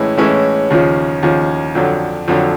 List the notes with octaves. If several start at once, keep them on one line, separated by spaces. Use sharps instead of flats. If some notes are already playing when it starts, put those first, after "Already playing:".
Already playing: A2 E3 G#3 C#4 E4
A2 E3 G#3 C#4 E4
D#2 C#3 F3
D#2 C#3 F3
F2 D3 F#3
F2 D3 F#3